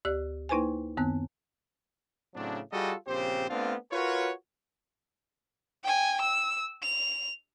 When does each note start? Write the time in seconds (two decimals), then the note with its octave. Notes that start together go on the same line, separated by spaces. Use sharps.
0.05 D2 G4 D5 F#6
0.49 A#3 D#4 E4 B4 C5 G#5
0.97 F#2 D#3 B3 C4 F#6
2.36 A2 C#3 F#3 C4 D4
2.72 G3 F4 F#4 G#4 A4 D#5
3.08 A#1 C#3 C4 G4 C5
3.49 A3 B3 C4 D4 F4 F5
3.92 F4 F#4 A#4 B4 C#5
5.84 G5 G#5
6.21 E6
6.82 F7